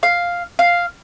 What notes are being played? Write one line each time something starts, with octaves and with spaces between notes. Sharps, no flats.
F5
F5